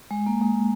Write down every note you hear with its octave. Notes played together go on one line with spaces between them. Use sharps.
G#3
A#3
G#3